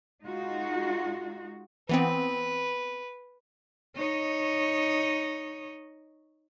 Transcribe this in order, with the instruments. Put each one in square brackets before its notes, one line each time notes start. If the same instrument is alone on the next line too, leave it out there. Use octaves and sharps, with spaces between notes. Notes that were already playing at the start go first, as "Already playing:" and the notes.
[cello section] G#3 D#4 F4 F#4
[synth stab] E3 B3 C4 [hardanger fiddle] B4
[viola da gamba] D#4 C#5 D#5